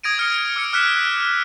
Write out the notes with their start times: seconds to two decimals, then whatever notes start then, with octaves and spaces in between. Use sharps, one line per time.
0.03 D#6 G#6 A#6 D7 D#7
0.18 D#6 F6 G#6 C#7
0.39 C#7
0.56 D6 E6 F6 C#7 D7
0.73 D6 F6 F#6 B6 E7